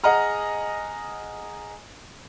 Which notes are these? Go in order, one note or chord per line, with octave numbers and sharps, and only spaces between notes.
G#4 D#5 F#5 A#5 F6